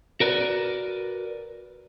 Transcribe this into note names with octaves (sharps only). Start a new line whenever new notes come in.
F#4 A#4 B4 D5